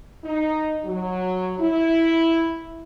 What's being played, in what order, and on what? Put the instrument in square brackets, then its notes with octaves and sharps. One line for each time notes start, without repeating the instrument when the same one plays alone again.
[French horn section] D#4
F#3
E4